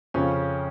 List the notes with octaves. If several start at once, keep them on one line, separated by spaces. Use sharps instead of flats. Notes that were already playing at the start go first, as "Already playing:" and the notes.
F2 C#3 C#4